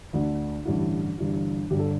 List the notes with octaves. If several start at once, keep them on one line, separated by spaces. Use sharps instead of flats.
D2 D3
A1 G2 D3 E4
G1 G2 E3
G1 G2 D3 G4
A4